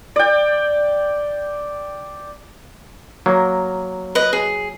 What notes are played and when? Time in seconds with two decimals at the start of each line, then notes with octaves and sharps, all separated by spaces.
0.16 D5 G5
3.26 F#3 A#3
4.15 B4 D#5
4.33 G#4